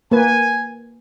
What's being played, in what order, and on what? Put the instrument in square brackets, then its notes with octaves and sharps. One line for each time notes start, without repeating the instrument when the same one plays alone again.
[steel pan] A#3 B4 [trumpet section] G#5